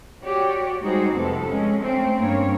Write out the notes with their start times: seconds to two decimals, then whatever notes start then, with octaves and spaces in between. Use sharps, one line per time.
0.23 F#4 G4 C#5 D5
0.81 G3 G#3 D#4 F#4 G#4 C5
1.14 F2 C3 B3 A4
1.48 G#3 C#4
1.82 A3 C4 C#4
2.20 G2 A#3 C#4 C#5